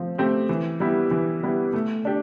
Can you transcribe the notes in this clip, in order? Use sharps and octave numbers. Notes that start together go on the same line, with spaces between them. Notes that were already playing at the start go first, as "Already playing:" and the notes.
Already playing: F3 A3 C4
A3 C4 G4
E3
G3 B3 E4 G4
E3
G3 B3 E4 G4
A3
D4 G4